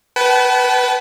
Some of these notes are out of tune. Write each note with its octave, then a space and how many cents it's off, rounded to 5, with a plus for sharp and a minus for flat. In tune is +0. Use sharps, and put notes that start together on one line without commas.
B4 +0 F#5 +45 A5 -35